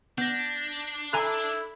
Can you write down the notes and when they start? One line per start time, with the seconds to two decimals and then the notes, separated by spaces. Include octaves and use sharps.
0.18 B3 D4 G6 A#6
1.13 E4 A4 G#5 A#5 F#6